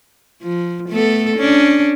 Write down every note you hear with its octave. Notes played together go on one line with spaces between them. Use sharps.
F3
A3 B3 A4
C#4 D4